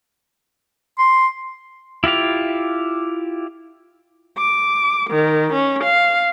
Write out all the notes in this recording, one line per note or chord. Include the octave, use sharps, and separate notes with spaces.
C6
E4 F4 G4 F5
D6
D#3
C#4
F5